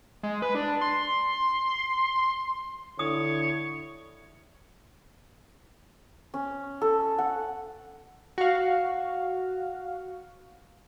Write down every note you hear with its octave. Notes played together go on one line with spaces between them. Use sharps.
G#3
B4
D4
C6
D3 E4 C#5 D#6
C#4
A4
F#5
F#4 F5